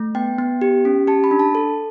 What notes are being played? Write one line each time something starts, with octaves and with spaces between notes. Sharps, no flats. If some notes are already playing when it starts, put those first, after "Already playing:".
Already playing: A3
B3 G5
B3
G4
C#4
G4 A5
B5
D4
A5
A4